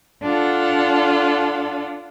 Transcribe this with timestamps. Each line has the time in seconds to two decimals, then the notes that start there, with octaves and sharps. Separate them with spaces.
0.22 D4 F4 A4 F#5